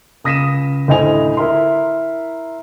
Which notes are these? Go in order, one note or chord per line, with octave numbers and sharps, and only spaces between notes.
C#2 D#6 A#6 B6 D#7 E7
D2 A2 C5 D#5 G#5 F7
E4 A#4 E5 A#5 C6